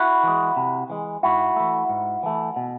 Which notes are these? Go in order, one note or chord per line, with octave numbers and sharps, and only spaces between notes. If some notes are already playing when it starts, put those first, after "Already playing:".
Already playing: E4 F#4
E3 G#3
C3
E3 G#3
G#2 E4 F#4
E3 A3
G#2
E3 A3
B2